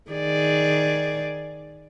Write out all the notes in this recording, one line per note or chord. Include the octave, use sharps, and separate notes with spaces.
D#3 G#4 D5